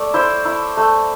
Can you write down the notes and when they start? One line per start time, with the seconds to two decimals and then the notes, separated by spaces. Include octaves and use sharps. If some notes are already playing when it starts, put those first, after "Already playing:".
Already playing: A3 D5 E5 D6
0.14 E4 C5
0.45 E4
0.77 A3